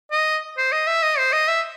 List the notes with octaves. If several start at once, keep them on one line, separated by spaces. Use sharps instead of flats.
D#5
C5
D#5
E5
D#5
C5
D#5
E5